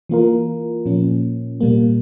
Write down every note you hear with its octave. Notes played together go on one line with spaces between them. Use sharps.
E3 A#3 F4 A#4
A#2 F3 A#3 C#4
A#2 G3 A#3